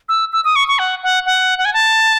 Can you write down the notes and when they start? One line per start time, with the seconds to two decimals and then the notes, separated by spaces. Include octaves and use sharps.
0.09 E6
0.33 E6
0.45 D#6
0.56 C#6
0.68 C#6
0.79 F#5
1.03 F#5
1.26 F#5
1.58 F#5
1.65 G#5
1.74 A5